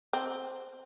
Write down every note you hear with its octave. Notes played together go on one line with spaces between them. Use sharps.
C4